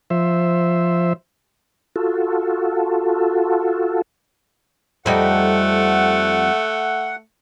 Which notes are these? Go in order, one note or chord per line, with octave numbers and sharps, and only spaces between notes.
F3 C5 E5
F4 F#4 A4
F2 G3 A3 D#4 F#5